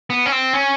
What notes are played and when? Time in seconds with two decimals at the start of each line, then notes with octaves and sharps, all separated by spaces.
0.10 B3
0.26 C#4
0.32 C4
0.54 C#4